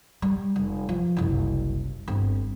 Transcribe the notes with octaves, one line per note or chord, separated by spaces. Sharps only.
G3
F1
F3
F#1 C2
G1 C4